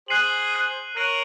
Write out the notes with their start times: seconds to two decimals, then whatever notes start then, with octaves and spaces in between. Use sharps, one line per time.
0.08 G#4 C5 F#6 C7 D#7 F#7
0.52 F#6 C7 D#7 F#7
0.96 A#4 C#5 F#6 C7 D#7 F#7